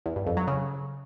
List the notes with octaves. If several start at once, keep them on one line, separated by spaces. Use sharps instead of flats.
E2
G2
F2
F#3
C#3